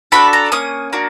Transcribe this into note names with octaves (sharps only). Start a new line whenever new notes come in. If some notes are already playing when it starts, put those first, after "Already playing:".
D4 F#4 A4 B5
A#5
A#3 C#4 D#6
A#3 D4 F#4